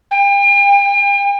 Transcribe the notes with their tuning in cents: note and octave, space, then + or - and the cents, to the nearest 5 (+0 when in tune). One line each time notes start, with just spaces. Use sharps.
G5 +40